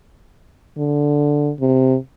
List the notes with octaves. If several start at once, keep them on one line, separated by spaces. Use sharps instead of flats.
D3
C3